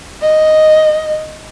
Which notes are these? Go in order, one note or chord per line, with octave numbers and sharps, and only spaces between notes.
D#5